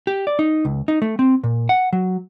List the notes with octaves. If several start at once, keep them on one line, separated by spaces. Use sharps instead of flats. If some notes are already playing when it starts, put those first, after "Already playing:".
G4
D5
D#4
C#2
D#4
A3
C4
A#2
F#5
F#3